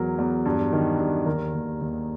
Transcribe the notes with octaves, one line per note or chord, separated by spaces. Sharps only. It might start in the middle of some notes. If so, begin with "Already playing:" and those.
Already playing: E2 E3 F#3 A#4
E2
G2
D#3
G2
D#2 A#4
D#2
D#2